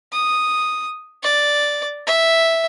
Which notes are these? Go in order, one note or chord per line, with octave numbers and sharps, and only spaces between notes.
D#6
D5
E5